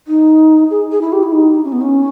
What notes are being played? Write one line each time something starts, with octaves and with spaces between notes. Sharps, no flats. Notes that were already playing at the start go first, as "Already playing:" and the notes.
D#4
G#4
G#4
E4
G4
E4
D#4
C#4
B3
C#4